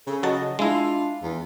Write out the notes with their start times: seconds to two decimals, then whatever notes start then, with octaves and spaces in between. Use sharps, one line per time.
0.07 C#3 A4
0.23 F#3 F#4 D#5 A5
0.59 G#3 D4 E4 F4
1.23 E2 B3